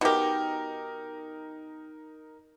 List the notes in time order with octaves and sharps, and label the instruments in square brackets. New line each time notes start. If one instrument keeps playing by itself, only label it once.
[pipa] B2 G4 [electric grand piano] D#4 A#4